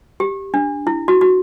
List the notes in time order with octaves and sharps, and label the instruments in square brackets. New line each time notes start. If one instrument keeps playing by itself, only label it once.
[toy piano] G4
D4
E4
F#4
F#4